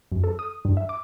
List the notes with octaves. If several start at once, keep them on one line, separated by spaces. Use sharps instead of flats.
F#2
A4
D#6
G2
E5
D6